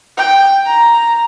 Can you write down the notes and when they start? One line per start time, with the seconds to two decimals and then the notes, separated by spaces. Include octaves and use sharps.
0.17 G5
0.66 A#5